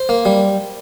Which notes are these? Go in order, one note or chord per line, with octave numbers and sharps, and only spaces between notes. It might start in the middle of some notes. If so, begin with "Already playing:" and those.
Already playing: C5
A#3
G3